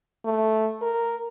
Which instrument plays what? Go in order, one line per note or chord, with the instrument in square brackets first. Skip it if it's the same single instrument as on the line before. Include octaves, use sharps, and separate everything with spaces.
[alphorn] A3
A#4